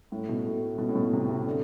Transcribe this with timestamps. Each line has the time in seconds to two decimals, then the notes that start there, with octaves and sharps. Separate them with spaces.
0.12 A2
0.29 B2
0.45 A3
0.62 A3
0.78 B2
0.89 A2
0.95 B2
1.13 C3
1.29 C3
1.47 D3